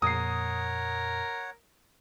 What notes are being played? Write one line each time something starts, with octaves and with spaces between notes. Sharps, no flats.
F2 A#2 A#4 C#5 F#5 D#6 C7